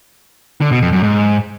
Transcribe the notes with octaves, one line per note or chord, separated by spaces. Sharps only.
D3
B2
F2
F#2
G#2